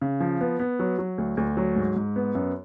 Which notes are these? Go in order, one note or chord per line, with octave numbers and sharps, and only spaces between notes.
C#3
F3
B3
B3
F#3
F#3
D2
D2
F#3
G#2
G#2
B3
F#2